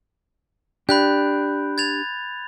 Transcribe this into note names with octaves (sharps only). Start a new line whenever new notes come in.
D4 G4 B5 F#6 G6
G#6 A6 F7